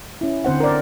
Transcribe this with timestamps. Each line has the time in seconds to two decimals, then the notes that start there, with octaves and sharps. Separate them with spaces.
0.21 C#4 E4
0.45 D3 C4 C5 F#5
0.60 A#4 D5